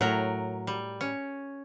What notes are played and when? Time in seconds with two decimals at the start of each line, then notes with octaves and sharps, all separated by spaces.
0.01 A2 F#3 A#4
0.67 G3
1.01 C#4